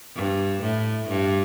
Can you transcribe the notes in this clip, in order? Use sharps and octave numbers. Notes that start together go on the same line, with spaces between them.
G2
A2
G2